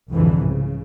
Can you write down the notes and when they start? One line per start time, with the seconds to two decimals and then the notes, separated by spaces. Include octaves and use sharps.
0.11 C2 F2 G#2 D3 E3
0.43 C#3